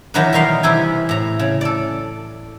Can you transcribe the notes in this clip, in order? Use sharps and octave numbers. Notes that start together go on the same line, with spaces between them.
D#3 E3 F#3 D#4 G4 B4
B2 G3 F#4 A#4 F5 C6
C3 E3 E4 G4 G#5
A2 A#5
C#3
A4 D5